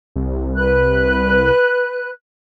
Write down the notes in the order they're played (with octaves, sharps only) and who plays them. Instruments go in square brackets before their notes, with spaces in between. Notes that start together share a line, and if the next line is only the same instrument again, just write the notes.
[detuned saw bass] C2
[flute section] B4 F#6